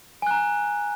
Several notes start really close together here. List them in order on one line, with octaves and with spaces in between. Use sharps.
G#5 F#6 A#5